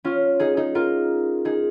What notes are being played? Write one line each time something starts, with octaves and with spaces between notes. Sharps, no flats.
C#4 F4
D#4 G#4
D#4 G#4
F4 A#4
D#4 G#4